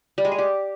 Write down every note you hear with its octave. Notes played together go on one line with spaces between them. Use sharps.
G3
G#3
G#4
G4